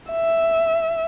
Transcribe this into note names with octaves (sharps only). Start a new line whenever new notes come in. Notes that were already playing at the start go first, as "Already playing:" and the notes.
E5